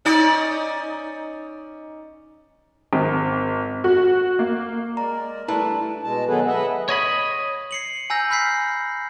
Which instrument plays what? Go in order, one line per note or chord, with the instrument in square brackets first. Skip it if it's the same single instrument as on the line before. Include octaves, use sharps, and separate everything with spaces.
[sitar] C#4 D#4 D5
[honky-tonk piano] G#1
F#4
A#3
[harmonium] G#3 A#4 D5 [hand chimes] A#5
[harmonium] G3 A3 D4 [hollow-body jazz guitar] E4 B4 [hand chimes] A5
[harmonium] B2 G#3 A5
D#3 F#3 B3 G#4 A4 B4
B4 D#5 E5 F#5
[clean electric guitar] C#5 D#5 B5
[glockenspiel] C7 C#7 F#7
G#5 A#5 E6 G6 A#6
B5 F6 G6 B6 C7